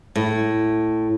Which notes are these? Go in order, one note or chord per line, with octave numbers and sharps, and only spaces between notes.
A2